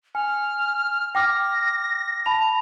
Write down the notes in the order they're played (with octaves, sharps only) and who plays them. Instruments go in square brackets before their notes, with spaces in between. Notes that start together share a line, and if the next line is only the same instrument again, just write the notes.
[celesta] G#5 [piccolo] F6
[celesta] G5 D6 F6 [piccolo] A#6
[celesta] A5 B5 F7